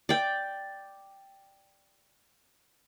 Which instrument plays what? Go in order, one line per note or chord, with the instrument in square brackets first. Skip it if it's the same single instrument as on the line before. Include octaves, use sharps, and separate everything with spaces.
[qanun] D5 G5